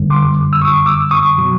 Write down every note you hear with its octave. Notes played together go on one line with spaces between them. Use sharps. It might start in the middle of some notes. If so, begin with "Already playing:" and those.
Already playing: F#2 D3 G3
C6 D6
E6
C#6 D#6
D6 E6
C#6 D#6
B2 F#3